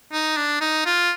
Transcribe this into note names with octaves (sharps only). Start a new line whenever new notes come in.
D#4
D4
D#4
F4